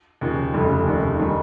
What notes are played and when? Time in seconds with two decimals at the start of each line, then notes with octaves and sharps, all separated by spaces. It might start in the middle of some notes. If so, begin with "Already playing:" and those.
0.21 D#2 C#3 F3
0.54 F1 F2 C#3 G3
0.86 F1 D#2 C#3
1.19 D#3 G3